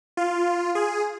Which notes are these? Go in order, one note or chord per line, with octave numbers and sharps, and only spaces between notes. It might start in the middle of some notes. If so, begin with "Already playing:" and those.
F4
G#4